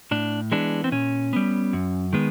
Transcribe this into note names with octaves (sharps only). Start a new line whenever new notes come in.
A2 D4
E3 G#3 B3 D4
C4
A#2 C#4
G3 B3
F#2
D#3 G#3 B3